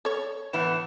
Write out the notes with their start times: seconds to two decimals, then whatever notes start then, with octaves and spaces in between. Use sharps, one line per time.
0.05 A4 C#5
0.53 A2 E3 B3 E7